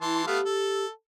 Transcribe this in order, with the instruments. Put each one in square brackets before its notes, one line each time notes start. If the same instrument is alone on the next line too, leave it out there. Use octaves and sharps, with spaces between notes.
[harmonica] E3 A5 C6 [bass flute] E4
[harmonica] A3 B3 F5 [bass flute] G4
[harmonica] A4